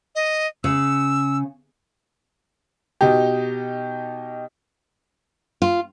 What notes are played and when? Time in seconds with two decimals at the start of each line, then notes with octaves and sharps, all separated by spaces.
0.15 D#5
0.64 C#3 E6
3.01 B2 D#4 G4
5.62 F4